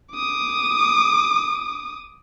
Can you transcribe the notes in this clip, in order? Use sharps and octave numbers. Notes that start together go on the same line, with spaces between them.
D6 D#6